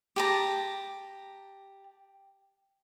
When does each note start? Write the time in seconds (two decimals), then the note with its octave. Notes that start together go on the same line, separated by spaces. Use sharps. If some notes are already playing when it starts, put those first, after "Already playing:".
0.16 G4 A5 A#5